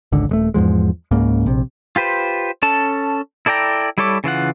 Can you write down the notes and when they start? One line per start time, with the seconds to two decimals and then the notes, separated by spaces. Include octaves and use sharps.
0.12 G#1 C#2 D3
0.29 D#1 G#3 A3
0.54 E2 G#2 F3 G#3
1.11 C#2 G#2 C#3 A#3
1.46 A#1 C3
1.96 F4 G4 B4 C5
2.62 C#4 A4 A5
3.46 E4 A4 D5 G5 A#5
3.98 G3 E4 A4 C#5 D6
4.24 C#3 E3 F4 F#5